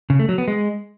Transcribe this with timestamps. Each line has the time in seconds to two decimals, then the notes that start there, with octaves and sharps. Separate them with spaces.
0.10 C#3
0.19 A3
0.29 F#3
0.38 B3
0.48 G#3